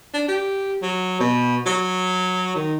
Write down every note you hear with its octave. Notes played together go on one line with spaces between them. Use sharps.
D4
G4
F#3
B2
F#3
D#3